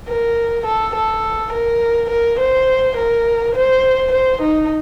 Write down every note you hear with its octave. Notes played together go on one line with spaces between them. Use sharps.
A#4
A4
A4
A#4
A#4
C5
A#4
C5
C5
D#4